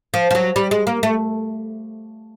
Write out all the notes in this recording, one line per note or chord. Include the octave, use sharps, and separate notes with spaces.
F3
F3
F#3
G3
G#3
A#3
A3